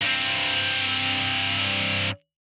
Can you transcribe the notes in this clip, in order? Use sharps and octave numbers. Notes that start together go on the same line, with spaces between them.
G2 C4